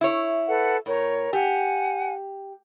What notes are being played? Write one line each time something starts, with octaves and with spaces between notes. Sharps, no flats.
E4 C#5
A4 B4 F#5
A2 A#4 C#5
G4 F#5 G#5